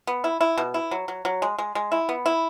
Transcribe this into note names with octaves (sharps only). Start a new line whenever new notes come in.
B3
E4
E4
B2
E4
F#3
F#3
F#3
G#3
G#3
G#3
E4
B3
E4